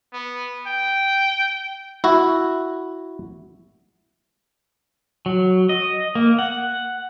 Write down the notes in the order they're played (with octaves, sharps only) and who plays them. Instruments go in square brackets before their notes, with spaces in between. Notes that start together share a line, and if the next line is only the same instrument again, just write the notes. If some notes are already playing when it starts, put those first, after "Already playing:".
[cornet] B3
G5
[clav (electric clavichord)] E4 F#4
[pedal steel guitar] F#3
D#5
A#3
F#5